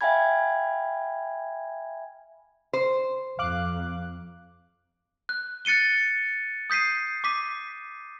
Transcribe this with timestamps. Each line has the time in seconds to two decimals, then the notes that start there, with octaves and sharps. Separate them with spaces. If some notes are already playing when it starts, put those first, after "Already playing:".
0.01 E5 F5 G5 G#5 B5 G#6
2.73 C5
3.39 F2 F5 D6 F#6
5.29 F#6
5.65 F#6 A6 C#7 D#7 G7
6.70 D#6 G6 B6 C7 D#7
7.24 D6 B6 D#7